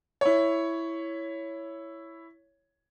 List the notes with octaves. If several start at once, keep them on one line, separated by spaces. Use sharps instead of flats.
E4 C#5